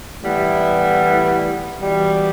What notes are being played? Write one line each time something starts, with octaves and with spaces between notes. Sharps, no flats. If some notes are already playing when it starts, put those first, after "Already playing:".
A2 E3 G3 B3 E4
E2 B2 G3